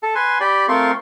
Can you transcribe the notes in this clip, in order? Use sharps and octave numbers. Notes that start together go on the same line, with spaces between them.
A4 A5
B4 G#5 C6
G4 D5 G5 B5
A3 C4 F4 A#4 C6 C#6